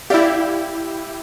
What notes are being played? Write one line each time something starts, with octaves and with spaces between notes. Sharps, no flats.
E4 G4 D5 E5 F5